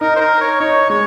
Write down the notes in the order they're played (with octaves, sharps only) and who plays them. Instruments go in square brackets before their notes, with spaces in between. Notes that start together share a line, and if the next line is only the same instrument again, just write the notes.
[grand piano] D#4 [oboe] A#4
[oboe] C5
A#4
C#5
[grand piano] D#4 [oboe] C#5
[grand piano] G#3 [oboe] C#5